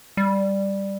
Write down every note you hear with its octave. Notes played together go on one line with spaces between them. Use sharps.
G3